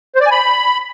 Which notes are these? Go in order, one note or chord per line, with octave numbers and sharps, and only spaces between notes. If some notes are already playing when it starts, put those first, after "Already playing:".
C5
D5
G#5
B5